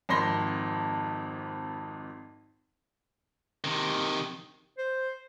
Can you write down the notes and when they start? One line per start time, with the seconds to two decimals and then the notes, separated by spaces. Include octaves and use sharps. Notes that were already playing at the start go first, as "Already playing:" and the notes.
0.09 G#1 F2 B5 C6 A#6 G7
3.64 C3 D#3
4.78 C5